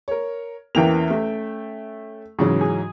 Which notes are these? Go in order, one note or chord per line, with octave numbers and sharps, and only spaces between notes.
A#4 C#5
E2 E3 A#3 C#4 G5 F7
A3
G#2 C#3 E3 F#3
G#4